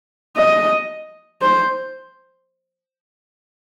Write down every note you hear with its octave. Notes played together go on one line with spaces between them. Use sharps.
D#5
C5